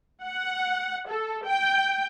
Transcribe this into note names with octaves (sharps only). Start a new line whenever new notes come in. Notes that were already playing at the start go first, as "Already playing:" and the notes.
F#5
A4
G5